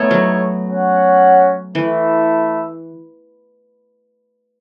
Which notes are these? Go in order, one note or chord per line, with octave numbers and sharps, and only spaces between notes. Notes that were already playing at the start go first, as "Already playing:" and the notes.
Already playing: A3 B3 D#4 A4 C#5
F#3
C#4 F#4 C#5 F#5
E3 A3 E4 A4 E5